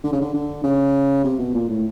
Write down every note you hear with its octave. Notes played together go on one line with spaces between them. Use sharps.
D3
C#3
D3
D3
C#3
C3
B2
A#2
A2